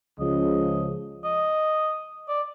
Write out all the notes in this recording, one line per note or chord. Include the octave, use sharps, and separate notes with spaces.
C#2 C#3 F3 D#5
D#5
D5